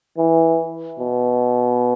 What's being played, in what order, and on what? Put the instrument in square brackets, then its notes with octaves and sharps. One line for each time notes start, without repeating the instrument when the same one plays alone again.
[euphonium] E3
B2